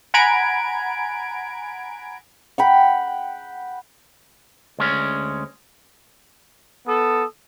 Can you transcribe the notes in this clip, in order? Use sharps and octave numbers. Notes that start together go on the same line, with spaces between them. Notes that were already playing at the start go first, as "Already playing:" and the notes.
F#5 G#5 A#5 B5 G#6 D7
F#5 G5 B5
D2 G#3 C#4
B3 A4 D#6